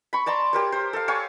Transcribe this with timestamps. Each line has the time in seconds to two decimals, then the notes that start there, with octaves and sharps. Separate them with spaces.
0.13 B5 C#6
0.26 D5 A5 A#5 C6
0.53 G4 A#4 C#5
0.72 C5
0.93 A4 F5
1.08 C#5 F5 G#5 C#6